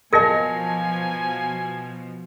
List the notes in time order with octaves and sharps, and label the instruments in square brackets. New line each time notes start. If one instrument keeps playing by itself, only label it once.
[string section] B2 F3 [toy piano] A#4 D#5 [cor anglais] G#5 [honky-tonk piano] A5 A#6 C#7